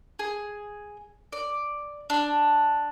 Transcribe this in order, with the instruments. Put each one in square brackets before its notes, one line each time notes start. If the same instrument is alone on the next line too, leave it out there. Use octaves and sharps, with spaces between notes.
[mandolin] G#4
D5
D4